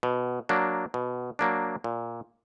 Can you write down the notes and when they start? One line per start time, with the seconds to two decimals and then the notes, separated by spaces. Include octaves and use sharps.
0.03 B2
0.49 F#3 A#3 D4
0.94 B2
1.39 F#3 A#3 D4
1.84 A#2